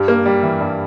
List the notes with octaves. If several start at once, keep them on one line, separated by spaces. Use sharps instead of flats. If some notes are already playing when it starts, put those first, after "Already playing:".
Already playing: G2 G4
A#3
G3
E3
G2